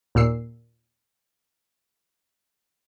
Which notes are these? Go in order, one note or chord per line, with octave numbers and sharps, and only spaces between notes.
D#2 A#2 E6 C7